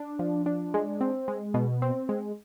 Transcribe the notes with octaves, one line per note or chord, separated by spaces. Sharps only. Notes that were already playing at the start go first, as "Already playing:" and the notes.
Already playing: D4
F3
D4
G#3
C4
G#3
B2
C4
G#3